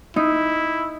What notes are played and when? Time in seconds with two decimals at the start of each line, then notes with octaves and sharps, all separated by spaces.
0.16 D#4 E4